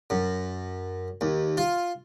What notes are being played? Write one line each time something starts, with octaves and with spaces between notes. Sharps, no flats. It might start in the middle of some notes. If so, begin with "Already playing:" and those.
F#2
D#2
F4